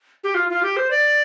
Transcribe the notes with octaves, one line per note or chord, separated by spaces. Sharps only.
G4
F4
F4
G4
C5
D5